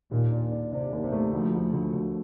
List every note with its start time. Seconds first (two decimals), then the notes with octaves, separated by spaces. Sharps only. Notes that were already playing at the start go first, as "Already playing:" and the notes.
0.11 D#2 A#2
0.31 D4
0.52 D4
0.72 C3 D4
0.92 D#2
1.03 C3
1.12 A3
1.32 D2 F3
1.54 D2
1.73 D2
1.93 D2